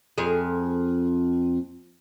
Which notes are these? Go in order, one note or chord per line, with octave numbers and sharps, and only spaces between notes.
F2 G#4